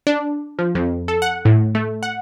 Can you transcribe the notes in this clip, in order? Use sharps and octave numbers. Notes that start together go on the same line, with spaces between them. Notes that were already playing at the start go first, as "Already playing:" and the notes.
D4
F3
F2
A4
F#5
A2
A3
F#5